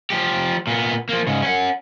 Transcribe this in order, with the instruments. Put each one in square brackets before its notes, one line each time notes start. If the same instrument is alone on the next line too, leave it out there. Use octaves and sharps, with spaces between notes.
[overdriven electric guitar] F3 G4
A#2 B3
F3 A#3
G#2 C#3
C#4 F#5